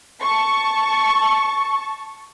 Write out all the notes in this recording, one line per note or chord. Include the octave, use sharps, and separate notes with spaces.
A5 C#6